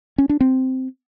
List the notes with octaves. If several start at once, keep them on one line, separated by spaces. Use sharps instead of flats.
C#4
D4
C4